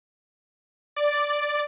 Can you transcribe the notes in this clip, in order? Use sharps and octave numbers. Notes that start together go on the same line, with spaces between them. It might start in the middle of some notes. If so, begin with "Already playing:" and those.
D5